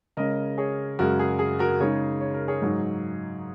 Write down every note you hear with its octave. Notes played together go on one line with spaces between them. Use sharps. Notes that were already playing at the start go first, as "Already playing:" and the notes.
C#3 G#3 C#4 A#4 D#5
G#4 C#5
F#2 C#3 G#3 F#4 A#4
G#4
G#4
F#4 A#4
C#3 G#3 D#4 G#4 C#5
C#5
A#4
G#4 C#5
G#2 F#3 D#4